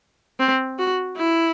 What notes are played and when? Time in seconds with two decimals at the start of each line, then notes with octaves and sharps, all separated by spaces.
0.39 C4
0.79 F#4
1.17 E4